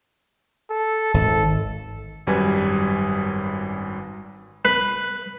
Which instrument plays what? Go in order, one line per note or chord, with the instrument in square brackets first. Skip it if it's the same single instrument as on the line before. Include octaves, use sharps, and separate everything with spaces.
[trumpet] A4
[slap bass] G#1 [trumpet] A4
[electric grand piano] G#1 F#2 G3 B4 G#5 G#6
[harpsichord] B4